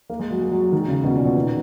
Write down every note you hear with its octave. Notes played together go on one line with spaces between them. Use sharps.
A#3
G#3
F#3
G#3
F#3
F#3
D#3
C#3
B2
A#2
B2
D#3